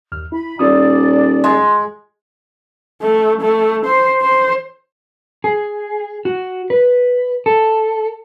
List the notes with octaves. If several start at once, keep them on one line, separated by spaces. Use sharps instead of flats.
D#2 F6
E4 B5
D#1 F4 D5 D#6 E6
G#3
A3
A3
C5
C5
G#4
F#4
B4
A4